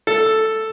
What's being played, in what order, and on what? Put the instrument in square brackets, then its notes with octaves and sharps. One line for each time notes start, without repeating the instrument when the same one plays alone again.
[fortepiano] A4